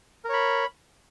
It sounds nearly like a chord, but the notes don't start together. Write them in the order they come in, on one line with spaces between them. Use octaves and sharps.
A#4 C#5 B5